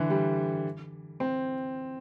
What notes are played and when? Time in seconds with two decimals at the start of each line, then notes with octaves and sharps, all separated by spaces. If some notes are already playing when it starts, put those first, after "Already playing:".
Already playing: D3 E3
0.10 G3
1.20 C4